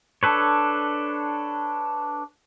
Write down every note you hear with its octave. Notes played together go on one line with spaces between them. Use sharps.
D4 A4 B4 C#5